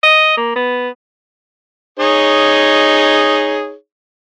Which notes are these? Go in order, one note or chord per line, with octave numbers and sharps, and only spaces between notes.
D#5
A#3
B3
D#4 G#4 C#5